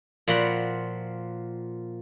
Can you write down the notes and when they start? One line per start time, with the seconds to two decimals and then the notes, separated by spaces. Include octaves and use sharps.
0.28 A#2 F3 F#4 F#5 B5